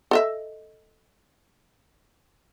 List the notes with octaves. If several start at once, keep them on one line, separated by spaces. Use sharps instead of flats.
A4 D#5 E5